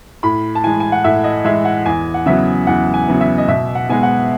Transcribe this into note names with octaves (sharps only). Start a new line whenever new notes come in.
A2 B5
A5
E3 G#3 G#5
G#5
F#5
A2 E5
D#5
E3 G#3 E5
F#5
E2 G#5
F#5
C#3 F#3 B3 E5
E2 F#5
G#5
C#3 F#3 B3
E5
D#5
B2 E5
F#5
G#3 B3 G#5
F#5